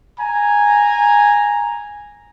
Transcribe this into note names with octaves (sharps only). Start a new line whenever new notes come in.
G#5 A#5